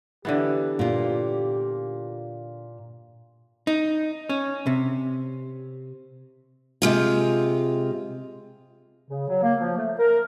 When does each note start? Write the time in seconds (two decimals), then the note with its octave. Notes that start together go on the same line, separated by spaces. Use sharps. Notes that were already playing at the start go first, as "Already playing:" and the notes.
0.25 D3 E3 B3 G4
0.79 A#2 F4
3.67 D#4
4.29 C#4
4.67 C3
6.82 C3 G#3 F4
9.08 C#3
9.28 F#3
9.42 A#3
9.60 F3
9.77 A3
9.99 A#4